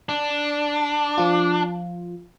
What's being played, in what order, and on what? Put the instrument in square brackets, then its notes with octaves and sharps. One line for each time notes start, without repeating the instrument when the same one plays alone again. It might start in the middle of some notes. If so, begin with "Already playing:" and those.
[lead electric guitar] D4
[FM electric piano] F3 F4